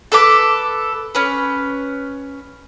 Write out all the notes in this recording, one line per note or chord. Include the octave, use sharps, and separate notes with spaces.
A4 B4 D6
C#4 B4